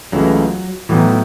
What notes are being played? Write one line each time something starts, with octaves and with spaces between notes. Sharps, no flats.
C#2 C#3 E3 F#3 A3 E4
A2 E3 F#3 B3 D#4